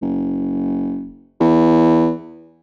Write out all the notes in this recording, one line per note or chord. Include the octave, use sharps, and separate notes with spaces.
F#1
E2